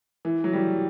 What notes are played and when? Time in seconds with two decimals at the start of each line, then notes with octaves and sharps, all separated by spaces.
0.25 E3
0.44 F#3
0.53 G3